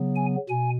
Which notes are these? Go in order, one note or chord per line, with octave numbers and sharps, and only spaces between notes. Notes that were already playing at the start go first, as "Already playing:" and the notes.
Already playing: C#3 F#3 B3
G#5
B2 G#5